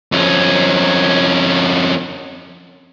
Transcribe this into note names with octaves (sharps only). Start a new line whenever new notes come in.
F2 C#4